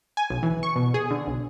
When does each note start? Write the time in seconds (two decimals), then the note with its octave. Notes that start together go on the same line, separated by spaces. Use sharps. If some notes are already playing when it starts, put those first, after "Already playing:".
0.17 G#5
0.30 B1
0.43 E3
0.63 C#6
0.76 B2
0.94 G#4
1.11 D3
1.27 B1